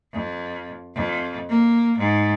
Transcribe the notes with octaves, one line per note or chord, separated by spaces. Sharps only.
F2
F2
A#3
G#2